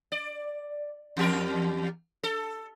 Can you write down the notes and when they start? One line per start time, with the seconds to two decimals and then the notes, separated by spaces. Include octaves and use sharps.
0.12 D5
1.17 E2 G4 A#4
2.23 A4